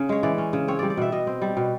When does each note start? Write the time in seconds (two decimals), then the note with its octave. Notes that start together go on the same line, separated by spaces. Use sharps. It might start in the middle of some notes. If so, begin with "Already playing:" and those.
Already playing: C#3 C#4
0.09 G#3 C#5
0.23 E3 D5
0.38 C#4
0.53 C#3
0.68 C4 C#5
0.79 G3 D5
0.90 D5
0.97 B2 E5
1.12 B2 D#5
1.27 C4
1.42 G3
1.57 B2